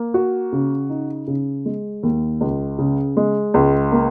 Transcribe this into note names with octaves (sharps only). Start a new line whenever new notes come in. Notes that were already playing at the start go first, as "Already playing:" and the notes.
Already playing: A#3
F#4
C#3
D#4
C#3
G#3
D#2
C#2
C#3
G#3
C#2
A#3